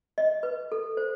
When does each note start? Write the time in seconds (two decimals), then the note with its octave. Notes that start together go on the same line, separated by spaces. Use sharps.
0.18 D#5
0.43 B4
0.72 A4
0.97 C5